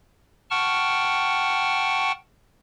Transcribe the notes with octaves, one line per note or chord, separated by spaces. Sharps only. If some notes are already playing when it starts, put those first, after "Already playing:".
F#5 G5 A5 C#6 F6